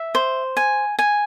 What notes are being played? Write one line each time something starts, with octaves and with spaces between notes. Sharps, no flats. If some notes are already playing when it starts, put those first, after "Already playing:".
Already playing: E5
C5
G#5
G#5